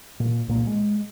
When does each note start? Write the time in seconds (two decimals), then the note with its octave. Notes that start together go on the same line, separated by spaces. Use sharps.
0.20 A#2
0.48 C2 A#2 A#3
0.67 G#3